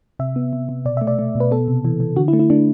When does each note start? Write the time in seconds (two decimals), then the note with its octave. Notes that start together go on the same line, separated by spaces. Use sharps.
0.19 C3 E5
0.36 B3
0.53 C3
0.69 C3
0.85 B2 D5
0.97 A3 E5
1.07 D5
1.19 A3
1.35 B2
1.40 B4
1.51 B3 A4
1.68 C3
1.85 E3
2.00 E3
2.16 D3 F#4
2.28 E4
2.33 A3
2.39 E4
2.50 A3 D4